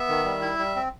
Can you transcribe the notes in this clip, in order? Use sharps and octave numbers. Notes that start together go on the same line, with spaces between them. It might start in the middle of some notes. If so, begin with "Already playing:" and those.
Already playing: B3 E5
D#3
G3
E4
G3
C4